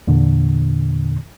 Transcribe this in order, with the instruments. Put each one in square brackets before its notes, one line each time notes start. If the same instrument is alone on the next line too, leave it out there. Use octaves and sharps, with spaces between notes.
[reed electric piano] E2 A#2 D3